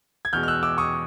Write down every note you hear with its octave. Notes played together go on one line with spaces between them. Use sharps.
G#6
E2 B2 G#3 F6 G6
F6
E6 F#6
D6 E6
C#6 D#6